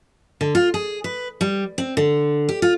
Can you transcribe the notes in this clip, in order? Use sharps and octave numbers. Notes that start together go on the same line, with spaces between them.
D3
F4
G#4
B4
G3
C4
D3
G4
F4